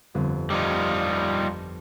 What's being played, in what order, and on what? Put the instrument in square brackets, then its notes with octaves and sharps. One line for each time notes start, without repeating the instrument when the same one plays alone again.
[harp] G1 F2
[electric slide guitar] G3 D#4 F4
[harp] A5 B5 G6